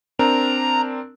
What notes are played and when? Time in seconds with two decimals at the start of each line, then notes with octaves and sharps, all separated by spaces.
0.19 C4 D4 A#4 A#5